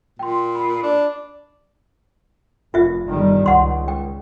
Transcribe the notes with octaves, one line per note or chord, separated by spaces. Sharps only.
A#2 G5 C6
B5
D4
F1 F4 E5
G1 D#3 G3
C#2 F#5 C6
G5